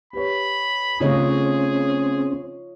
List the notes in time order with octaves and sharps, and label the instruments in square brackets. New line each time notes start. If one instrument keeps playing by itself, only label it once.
[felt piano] G4 B4 C#5 [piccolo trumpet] B5
[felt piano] C#3 A3 [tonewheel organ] C4 C#4 [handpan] F4 C#5 D#5 [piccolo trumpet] G#4